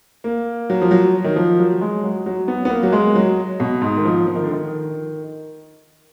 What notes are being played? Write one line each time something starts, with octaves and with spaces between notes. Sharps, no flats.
A#3
F#3
F3
F#3
D#3
F3
F#3
G#3
F#3
F#3
B3
B3
A#3
F#3
G#3
F#3
B2
G#2
D#3
F3
F3
D#3
D3
D#3